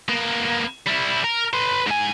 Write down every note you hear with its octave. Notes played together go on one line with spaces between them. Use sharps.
A#3 B3
G3 E4
A#4
B4 C6
G#2 G#5